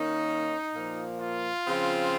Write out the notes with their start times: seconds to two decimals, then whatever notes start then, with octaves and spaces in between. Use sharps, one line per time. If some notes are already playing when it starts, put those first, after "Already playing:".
Already playing: D#3 A#3 C#4 D#4
0.73 A#2 F3 A#3
1.19 F4
1.66 C#3 F3 C4